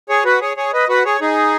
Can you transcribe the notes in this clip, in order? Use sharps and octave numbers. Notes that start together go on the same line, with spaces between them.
G#4 C#5
F#4 B4
G#4 C#5
G#4 C#5
B4 D#5
F#4 B4
G#4 C#5
D#4 G#4